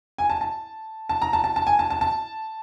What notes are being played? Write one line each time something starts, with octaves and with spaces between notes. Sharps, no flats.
G#5
A5
A5
A5
A#5
A5
A5
A5
G#5
A5
A5
A5